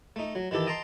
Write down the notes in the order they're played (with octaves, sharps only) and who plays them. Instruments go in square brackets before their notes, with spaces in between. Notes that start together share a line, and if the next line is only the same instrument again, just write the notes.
[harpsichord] A3 D#4
F#3
D#3 E3 G4 A4
D#5 G5 A5 A#5 C6